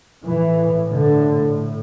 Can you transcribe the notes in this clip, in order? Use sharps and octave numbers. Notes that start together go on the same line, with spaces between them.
A2 E3
D3